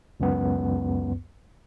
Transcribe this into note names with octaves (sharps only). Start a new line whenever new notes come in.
C#2 F#2 B3